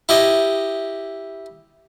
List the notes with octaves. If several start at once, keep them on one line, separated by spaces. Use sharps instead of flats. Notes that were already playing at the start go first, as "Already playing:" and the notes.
E4 G4 D#5